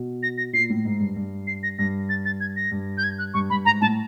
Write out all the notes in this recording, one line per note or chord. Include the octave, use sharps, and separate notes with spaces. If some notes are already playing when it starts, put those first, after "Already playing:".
Already playing: B2
A#6
A#6
A#2 C7
A2
G#2
G2
G2
C7
A#6
G2 A#6
A6
A6
G#6
A#6
G2
G6
G#6
F#6
G2 C#6
G2 B5
G#2 A#5
A2 A5